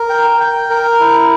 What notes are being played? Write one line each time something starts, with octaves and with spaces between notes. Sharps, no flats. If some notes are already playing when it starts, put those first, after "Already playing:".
Already playing: A#4
G5
G5
A#4
E4